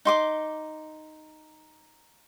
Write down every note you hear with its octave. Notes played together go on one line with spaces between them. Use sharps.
D#4 C6 D6